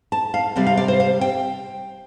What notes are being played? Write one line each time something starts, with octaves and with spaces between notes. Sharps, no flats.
A5
F5
C3 G3 C4 D5
F5
D5
C5
F5
G5